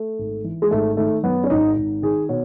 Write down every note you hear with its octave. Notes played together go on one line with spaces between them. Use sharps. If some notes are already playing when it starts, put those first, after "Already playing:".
Already playing: A3
G#1
E3
G#3
G#1 A3
D#3 A3
F#2 B3
C#4
G#1 D#4
G#1
D#3 G#4
B2 C#5